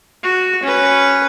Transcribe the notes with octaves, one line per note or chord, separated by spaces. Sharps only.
F#4
C#4 B4